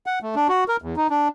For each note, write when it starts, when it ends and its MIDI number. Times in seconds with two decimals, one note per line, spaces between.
0.06 0.19 78
0.22 0.35 57
0.35 0.48 62
0.49 0.64 66
0.68 0.77 70
0.82 0.95 40
0.96 1.07 63
1.10 1.28 62